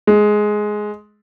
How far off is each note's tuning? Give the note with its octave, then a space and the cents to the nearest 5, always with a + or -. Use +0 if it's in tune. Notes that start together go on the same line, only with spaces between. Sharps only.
G#3 +10